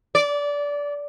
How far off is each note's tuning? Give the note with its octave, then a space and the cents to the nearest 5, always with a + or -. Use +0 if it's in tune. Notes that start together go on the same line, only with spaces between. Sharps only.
D5 -20